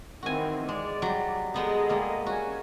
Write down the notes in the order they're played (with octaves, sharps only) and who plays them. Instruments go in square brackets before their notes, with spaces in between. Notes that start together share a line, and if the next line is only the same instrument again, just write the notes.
[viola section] D#3 E3 C4 [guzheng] F#4 G#5
[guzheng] G#3 [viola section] D5
[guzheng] F#3 G3
[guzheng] G#3 B3 D#4 [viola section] G#4 A4 D#5
[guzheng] G3 G#3 A#3
[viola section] C#4 G#5 [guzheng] F#4